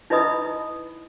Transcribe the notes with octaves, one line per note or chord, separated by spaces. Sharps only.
D#4 E4 B4 D#5 B5 D#6